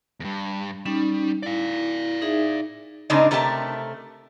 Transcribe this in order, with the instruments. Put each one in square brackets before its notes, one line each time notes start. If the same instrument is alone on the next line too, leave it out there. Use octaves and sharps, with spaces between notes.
[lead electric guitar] E2 G2
[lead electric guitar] G3 [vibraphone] C#4 D#4
[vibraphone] E4 [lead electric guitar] D5 F5
[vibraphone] D#4 G#4 E5
[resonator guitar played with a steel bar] G#2 C#3 G#3 C4 D4 D#4
C3 A3 G4 A#4 C#5 A5